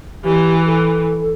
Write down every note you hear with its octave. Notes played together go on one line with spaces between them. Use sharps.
E3 G4
A4